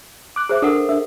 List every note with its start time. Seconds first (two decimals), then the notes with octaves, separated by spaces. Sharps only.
0.36 D6 F#6
0.49 G#4 C5 E5
0.62 D4 A4 A#4 F#5
0.89 D4 E5